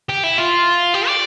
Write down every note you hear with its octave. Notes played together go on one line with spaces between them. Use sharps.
G4
E4
F4
G4
D5